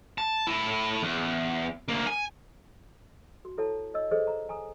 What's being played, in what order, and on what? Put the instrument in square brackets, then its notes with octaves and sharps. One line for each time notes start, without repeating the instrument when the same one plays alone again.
[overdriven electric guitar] A5
A2 E4
E2
D2 A#3
G#5
[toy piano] F#4
E4 A4 C#5 F#5 A5
C#5 D#5 E6
G#4 A4 C5 C#5 D#5
A#5
G#5 A#5 D#6